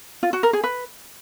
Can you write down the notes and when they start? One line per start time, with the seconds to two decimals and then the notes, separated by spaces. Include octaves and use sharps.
0.23 F4
0.33 F#4
0.43 A#4
0.53 G#4
0.64 B4